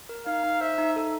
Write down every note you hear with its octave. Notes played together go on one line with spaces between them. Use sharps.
A#4
D#4 F5
D#4
C5 E5
D#4
A4